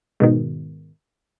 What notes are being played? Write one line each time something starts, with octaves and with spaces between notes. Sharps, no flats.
G#2 B2 D#3